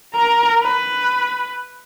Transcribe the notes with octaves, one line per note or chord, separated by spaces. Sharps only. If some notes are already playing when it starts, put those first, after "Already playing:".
A#4 A#5
B4